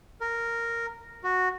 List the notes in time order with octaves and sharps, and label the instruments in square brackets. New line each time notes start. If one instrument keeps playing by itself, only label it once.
[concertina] A#4
F#4